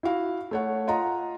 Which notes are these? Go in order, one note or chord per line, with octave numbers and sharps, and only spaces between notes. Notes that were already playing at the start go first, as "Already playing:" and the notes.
E4 F#4 F5
A3 C#5 F#5
F4 D#5 F#5 A#5